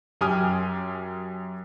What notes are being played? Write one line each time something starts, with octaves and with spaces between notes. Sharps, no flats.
F#2 G4 G#5 D#6 F6